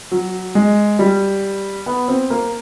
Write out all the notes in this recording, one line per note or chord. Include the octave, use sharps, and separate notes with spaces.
F#3
G#3
G3
B3
C4
A#3